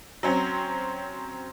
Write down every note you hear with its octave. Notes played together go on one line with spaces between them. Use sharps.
F#3 C4 C#4